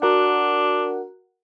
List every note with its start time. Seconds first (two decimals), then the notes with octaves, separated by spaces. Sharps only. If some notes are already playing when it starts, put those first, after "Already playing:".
0.02 D4 F#4 A#4 F#5